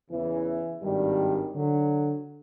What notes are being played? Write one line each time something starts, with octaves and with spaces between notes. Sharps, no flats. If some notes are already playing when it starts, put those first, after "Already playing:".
E2 C#3 E3
G#1 G2 D#3 G3
D3 F#3